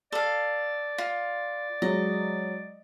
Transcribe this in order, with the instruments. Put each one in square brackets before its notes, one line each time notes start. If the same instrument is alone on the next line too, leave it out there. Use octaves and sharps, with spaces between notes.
[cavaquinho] A4 F5 [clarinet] D5
[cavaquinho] F4
[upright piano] F#3 G#3 [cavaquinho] D#5